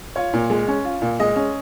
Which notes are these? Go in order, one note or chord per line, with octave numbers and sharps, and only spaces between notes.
F4 C#5
A#2
G#3
C#4
F4
A#2
G#3 D#5
C#4